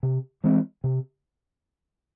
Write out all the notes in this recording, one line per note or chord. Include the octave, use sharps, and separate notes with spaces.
C3
E3 G#3 C4
C3